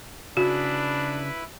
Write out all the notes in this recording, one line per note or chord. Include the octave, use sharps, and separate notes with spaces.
C#3 D4 E4 F#4 G#4 B4